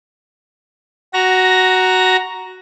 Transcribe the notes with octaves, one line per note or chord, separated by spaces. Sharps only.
F#4 A#5 A#6